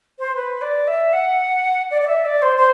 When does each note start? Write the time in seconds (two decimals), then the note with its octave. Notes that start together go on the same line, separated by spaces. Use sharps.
0.19 C5
0.35 B4
0.62 D5
0.87 E5
1.13 F#5
1.91 D5
2.01 D5
2.07 E5
2.25 D5
2.42 C5
2.57 C5